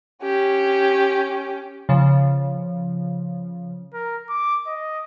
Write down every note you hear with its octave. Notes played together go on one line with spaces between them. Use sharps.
C#4 G4
C#3 F3
A#4
D6
D#5